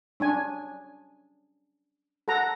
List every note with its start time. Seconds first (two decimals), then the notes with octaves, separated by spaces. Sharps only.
0.20 C#4 D4 G#5
2.28 A4 F#5 A#5